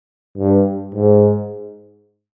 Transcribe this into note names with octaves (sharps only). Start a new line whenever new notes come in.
G2
G#2